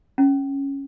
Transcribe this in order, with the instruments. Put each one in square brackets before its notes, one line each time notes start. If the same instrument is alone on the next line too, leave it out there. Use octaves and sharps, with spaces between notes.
[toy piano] C#4